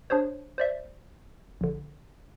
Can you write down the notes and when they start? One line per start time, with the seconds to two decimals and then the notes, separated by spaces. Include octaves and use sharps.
0.10 D4 G#4 C5 C#5
0.58 C5 D5 E5
1.61 A#1 D3